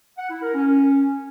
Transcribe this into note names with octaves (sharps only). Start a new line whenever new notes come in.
F#5
E4
A#4
C#4